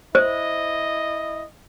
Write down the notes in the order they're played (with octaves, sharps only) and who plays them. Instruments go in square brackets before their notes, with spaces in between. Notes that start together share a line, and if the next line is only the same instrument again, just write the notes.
[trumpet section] E4 D#5 [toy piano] C5